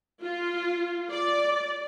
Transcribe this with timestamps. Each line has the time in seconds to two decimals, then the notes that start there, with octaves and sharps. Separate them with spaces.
0.23 F4
1.11 D5